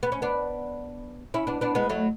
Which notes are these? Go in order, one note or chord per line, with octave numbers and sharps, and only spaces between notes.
B3
C#4
B3 D4
C#4 E4
B3 D4
B3 D4
G#3 B3
F#3 A3